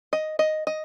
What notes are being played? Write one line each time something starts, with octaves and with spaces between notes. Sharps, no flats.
D#5
D#5
D#5